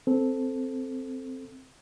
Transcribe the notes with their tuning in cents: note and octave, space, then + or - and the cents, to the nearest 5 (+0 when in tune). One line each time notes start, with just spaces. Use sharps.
C4 +0 A4 +0